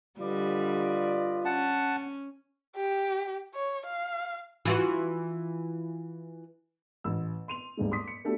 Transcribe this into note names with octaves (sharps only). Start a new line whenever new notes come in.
D3 G3 F4 B4 D5 D#5
C#4 F#5 A5
G4
C#5
F5
E3 F4 F#4
A1 E6
C6 D#7 F7
D#1 G2 G#3
C6 D6 D#6 B6
C#7
A3 B3 D4 F#4 G4 A4